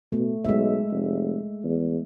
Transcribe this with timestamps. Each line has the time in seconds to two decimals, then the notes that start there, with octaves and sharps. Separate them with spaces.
0.12 B2 A3
0.45 B1 G#3 E5
0.91 F1
1.64 E2